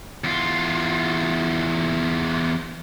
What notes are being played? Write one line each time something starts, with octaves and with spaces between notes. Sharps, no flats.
E2 F4